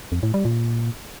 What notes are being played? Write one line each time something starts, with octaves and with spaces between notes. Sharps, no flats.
F2
A2
G3
A#2